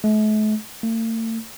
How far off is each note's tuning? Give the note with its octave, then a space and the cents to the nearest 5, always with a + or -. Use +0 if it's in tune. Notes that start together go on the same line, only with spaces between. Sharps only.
A3 -45
A3 +45